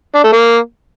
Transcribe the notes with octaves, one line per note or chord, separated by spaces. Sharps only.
D4
A3
A#3